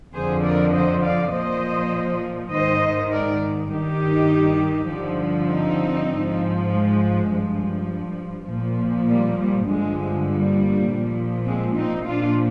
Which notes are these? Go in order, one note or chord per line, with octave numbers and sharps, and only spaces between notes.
F2 D3 F3 G#4 C5
A#4 D5
C5 D#5
D5 F5
A#2 F3 C5 D#5
G#2 D#3 C5 D#5
A#4 D5
G2 D#3 D#4 G4
G2 D3 F3
C4 D#4
G#2 F3
G#3
G2 F3
A#2 F3
G3 A#3
G3
G2 D3 F3 G#3
G3 A#3
A#2 F3
G#3 C4
C4 D#4
A#2 F3 D4 F4